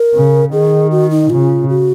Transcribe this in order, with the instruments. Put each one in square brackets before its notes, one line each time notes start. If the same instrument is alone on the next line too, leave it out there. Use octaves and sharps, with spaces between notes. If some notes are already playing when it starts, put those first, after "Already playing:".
Already playing: [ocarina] A#4
[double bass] C#3
[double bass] D#3 [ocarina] G#4
[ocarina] F#4
D#4
[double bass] C#3 [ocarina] F4
[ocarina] F#4